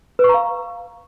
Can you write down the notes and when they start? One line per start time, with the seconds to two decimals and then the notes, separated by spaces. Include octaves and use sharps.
0.19 B4
0.24 C#6
0.29 A#5
0.34 F5